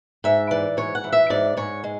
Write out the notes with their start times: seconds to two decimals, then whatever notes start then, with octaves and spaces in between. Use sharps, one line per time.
0.24 G#2 E5
0.51 E3 D5
0.77 G#2 C#5
0.95 F#5
1.04 E3
1.13 E5
1.30 G#2 D5
1.57 G#2 C#5
1.84 G#3